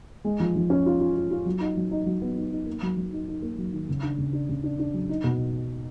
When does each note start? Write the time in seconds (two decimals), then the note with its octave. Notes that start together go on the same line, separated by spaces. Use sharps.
0.24 G#3
0.40 F3
0.56 F3
0.70 C#4
0.86 F4
1.00 F4
1.16 F4
1.31 F4
1.46 F#3
1.61 D#4
1.77 F#3
1.91 D#4
2.06 F#3
2.22 B3
2.36 D#4
2.52 D#4
2.66 A#3
2.83 F#3
2.97 F#3
3.13 D#4
3.28 D#4
3.42 A#3
3.58 F#3
3.73 D#3
3.89 C#3
4.03 D4
4.18 C#3
4.33 D4
4.49 C#3
4.64 D4
4.79 D4
4.94 F#3
5.09 D#4
5.24 B2